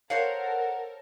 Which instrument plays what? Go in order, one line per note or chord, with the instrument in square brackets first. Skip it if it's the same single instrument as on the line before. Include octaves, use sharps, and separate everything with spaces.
[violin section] A4 A#4 [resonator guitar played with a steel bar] C5 C#5 F5 [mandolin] F#5